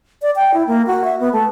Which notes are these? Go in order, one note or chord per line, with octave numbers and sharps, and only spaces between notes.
D5
G5
E4
A#3
F#4
E5
B3
A3